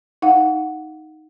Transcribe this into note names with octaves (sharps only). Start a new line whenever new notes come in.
D#4 F5 F#5